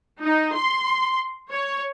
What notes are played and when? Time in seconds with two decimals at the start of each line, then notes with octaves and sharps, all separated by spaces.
0.22 D#4
0.55 C6
1.52 C#5